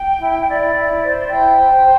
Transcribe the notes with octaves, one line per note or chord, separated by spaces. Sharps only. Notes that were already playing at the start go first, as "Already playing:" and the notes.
Already playing: G5
E4
E4 D5
E4
C5
E4 G5
C5
C5